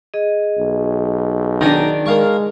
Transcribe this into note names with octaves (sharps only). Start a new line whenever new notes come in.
G#4 D#5
B1
D#3 D4 D5 G#5 A#5
G#3 A#3 F5 C#6